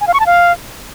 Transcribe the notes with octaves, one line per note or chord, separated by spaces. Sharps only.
G#5
F5
C#6
A5
F5